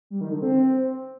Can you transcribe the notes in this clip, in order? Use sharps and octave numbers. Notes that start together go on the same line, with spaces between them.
G3
D#3
D3
C4